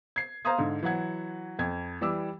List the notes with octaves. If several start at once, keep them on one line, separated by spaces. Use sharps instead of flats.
G#6 C7
C5 F5 A#5 C6 D#6 G#6
G#2 D3
E3 F#3 F#5 G#6
F2 G#6
E3 G3 D6 E6